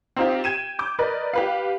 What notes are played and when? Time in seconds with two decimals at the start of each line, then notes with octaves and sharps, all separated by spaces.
0.17 C4 D#4 F4 G4
0.44 G5 G#6 D#7 E7
0.79 D6 G6
0.99 A#4 B4 D5 D#5
1.33 G4 B4 F5